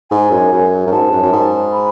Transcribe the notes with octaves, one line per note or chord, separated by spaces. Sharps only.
G#2 G#5
F#2
F#2
F#2
G#2 A5
F#2
F#2
G#2
B5